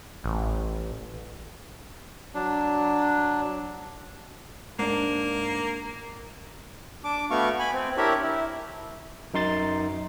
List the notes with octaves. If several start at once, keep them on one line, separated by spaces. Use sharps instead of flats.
A1
F#3 D4
G#2 A#3 D4
D4 D6
A3 B3 F#4 F5 C#6
G#5 B5
C4
D4 E4 G4 A#4 C#5 E5
E4
F#2 D#4 C6 A6